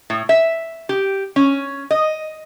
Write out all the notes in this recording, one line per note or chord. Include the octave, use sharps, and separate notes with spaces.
A2
E5
G4
C#4
D#5